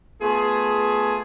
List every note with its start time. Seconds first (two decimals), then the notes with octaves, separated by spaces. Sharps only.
0.21 A3 B3 F4 G#4